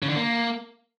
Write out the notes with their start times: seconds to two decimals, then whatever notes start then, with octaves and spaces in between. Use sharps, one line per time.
0.02 C#3
0.09 D3
0.16 A#3